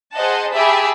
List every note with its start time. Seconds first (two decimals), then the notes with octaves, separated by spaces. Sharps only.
0.14 G#4 C5 D#5 F#5 A5
0.53 G4 G#4 E5 A5 B5